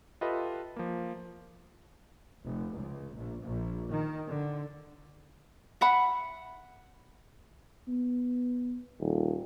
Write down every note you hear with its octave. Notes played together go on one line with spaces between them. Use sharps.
F4 G4 A4 B4 D#5 E5
F3 A#3
F1
C#2
A#1
A#1
D#3
D3
E5 F#5 B5
B3
D#1